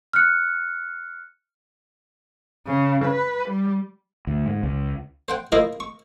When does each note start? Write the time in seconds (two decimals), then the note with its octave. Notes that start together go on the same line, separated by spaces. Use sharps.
0.13 F6 F#6 C#7
2.66 C#3
3.05 B4
3.49 G3
4.27 D2
4.46 G#2
4.63 C#2
5.28 C5 F#5 G5
5.52 A#3 E4 F4 C5 D#5 F5
5.80 C#6